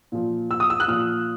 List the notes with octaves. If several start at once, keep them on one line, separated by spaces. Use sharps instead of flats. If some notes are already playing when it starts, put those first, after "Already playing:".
A#2 F3
E6
D#6
E6
F#6
A#2 F3 F6